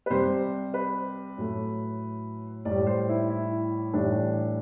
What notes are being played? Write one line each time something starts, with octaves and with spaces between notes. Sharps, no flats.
B4
C3 G3 C5
B4
A2 F#3 A3
A2 G3 D5
C5
E4
E4
A2 E3 G3 D4